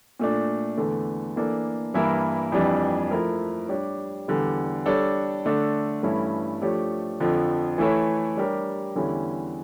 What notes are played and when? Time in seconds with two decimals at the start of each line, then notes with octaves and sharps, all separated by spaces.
0.20 A#2 A3 D4
0.78 E2 D3 A3
1.36 E3 A#3 D4 A4
1.94 G2 E3 A#3 E4 A#4
2.52 F2 E3 G3 D4
3.11 F3 A3 E4 A#4
3.69 G3 D4 G4 C#5
4.28 E2 D3 G3
4.86 G3 D4 A4 C#5
5.45 D3 A3 D4 A4
6.03 G2 E3 A3 C#4 E4
6.62 F3 A3 D4 G4 C#5
7.20 F2 D3 F3
7.78 E3 A3 E4 A4 C#5
8.37 G3 D4 G4 A#4 C#5
8.95 E2 D3 G3 C#4 E4